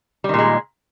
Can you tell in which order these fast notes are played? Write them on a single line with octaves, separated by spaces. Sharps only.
G3 D#3 A#2 G#3